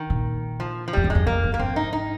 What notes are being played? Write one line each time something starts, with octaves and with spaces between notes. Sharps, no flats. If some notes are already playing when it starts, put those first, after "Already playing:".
Already playing: D#3
A#2
F3
F3
F2 G3
G2
G#3
F2
F2 A#3
G2
A#3
G#2 C4
D#4
D#4